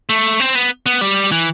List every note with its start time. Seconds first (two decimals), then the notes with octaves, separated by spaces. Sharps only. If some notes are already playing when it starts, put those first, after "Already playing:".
0.09 A3
0.40 C4
0.55 B3
0.86 B3
1.01 G3
1.32 E3